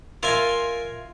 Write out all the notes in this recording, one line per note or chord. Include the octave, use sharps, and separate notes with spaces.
F4 A#4 E5 G#5